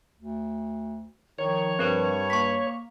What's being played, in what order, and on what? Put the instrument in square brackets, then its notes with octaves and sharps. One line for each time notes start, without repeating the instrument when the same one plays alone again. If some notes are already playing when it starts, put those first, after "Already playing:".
[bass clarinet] D2
[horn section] D#3 [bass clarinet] F3 [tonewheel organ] C#5
[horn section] G2 [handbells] C4 A#4 C5
[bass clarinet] A#3 [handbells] C#6 B6